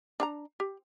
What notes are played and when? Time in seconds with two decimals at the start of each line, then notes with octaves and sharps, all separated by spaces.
0.20 D4 F5 A#5
0.60 G4